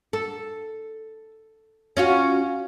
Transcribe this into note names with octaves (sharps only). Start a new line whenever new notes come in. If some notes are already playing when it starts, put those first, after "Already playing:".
A4
C#4 F4 F#4